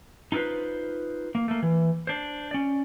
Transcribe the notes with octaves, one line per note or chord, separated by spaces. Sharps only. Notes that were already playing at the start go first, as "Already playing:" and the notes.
D#4 F4 A4 B4 C5
A#3
A3 A#3
E3
D4 C5
C#4 D5